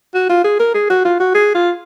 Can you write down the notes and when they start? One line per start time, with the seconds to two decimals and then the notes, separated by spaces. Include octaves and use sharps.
0.14 F#4
0.29 F4
0.44 G#4
0.59 A#4
0.74 G#4
0.90 F#4
1.04 F4
1.20 F#4
1.34 G#4
1.55 F4